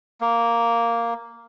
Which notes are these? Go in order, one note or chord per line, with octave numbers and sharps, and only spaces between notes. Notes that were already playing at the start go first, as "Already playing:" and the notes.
A#3